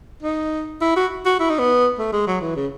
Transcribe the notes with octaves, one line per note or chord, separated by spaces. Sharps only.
D#4
E4
F#4
F#4
E4
D#4
B3
A3
G#3
F#3
E3
C#3